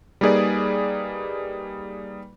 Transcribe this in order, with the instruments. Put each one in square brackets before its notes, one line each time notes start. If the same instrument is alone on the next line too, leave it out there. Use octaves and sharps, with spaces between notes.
[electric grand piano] G3 A#3 D#4 G#4 B4 D5